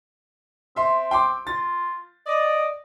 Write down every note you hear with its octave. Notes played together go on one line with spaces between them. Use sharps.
C4 E5 C6
G5 C6 D6
F4 A6
D5 D#5